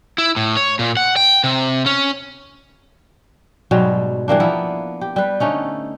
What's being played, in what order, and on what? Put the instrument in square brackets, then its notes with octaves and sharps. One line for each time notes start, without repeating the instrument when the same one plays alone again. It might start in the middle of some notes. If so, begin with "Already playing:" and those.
[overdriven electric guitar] E4
A2
C#5
A#2
F#5
G5
C3
C#4
[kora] G#2 B2 F#3 G3
E3 G3 A#3 D4
F3 A#3 B3 E4
G4
G3 B4
D3 A3 C#4 D#4